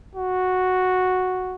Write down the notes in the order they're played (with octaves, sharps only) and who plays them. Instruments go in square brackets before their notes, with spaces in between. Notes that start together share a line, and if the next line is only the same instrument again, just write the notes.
[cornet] F#4